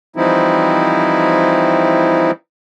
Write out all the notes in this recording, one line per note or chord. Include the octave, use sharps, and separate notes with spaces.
E3 F3 G3 C4 D#4 E4